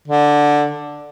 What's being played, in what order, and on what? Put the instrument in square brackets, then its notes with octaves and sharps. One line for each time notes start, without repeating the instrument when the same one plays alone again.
[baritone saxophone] D3